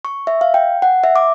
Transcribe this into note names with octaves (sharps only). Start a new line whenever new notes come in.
C#6
E5
F5
G5
F#5
E5
D6